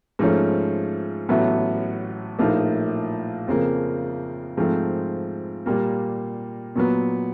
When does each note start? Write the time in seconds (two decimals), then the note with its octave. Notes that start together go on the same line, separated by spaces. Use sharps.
0.19 G#2 F3 A3 C#4
1.29 A1 A2 F#3 B3
2.39 A#1 A2 F3 A#3 D#4
3.48 F2 C#3 F3 A#3
4.57 G#2 F3 A3 C4
5.66 A#2 G3 A#3
6.75 A#2 F#3 B3